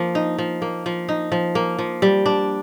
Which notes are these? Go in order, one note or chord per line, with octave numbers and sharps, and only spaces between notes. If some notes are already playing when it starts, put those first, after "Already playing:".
Already playing: F3 A#3
D#4
F3
A#3
F3
D#4
F3
A#3
F3
G3
D4